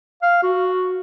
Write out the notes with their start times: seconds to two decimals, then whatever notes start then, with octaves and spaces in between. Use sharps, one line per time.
0.22 F5
0.43 F#4